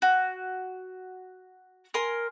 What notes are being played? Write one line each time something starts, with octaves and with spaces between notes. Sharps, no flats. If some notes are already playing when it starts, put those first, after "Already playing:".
F#4
A#4 G#5 C6